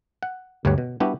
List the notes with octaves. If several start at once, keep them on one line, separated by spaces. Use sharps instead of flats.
F#5
D2 G2 F#4 G4 C#5 F#5
B2
G3 B3 D4 E4 F#4 G4